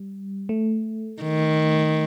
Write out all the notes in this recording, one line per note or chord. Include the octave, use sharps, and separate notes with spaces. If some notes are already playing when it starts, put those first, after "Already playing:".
Already playing: G3
A3
D#3